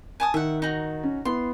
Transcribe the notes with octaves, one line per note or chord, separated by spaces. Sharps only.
G#5 A5 D#6
D#3 E5 F#5
D#4 F#4
C#4
B3 E4 C6